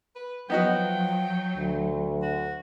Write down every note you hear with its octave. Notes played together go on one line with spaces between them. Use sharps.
B4
F3 F#3 B3 D#4 F#4 G5
D2
F#4